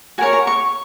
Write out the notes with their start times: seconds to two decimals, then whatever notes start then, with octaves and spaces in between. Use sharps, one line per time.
0.18 F#4 A#4 C#5 G#5
0.33 A#5
0.47 C#6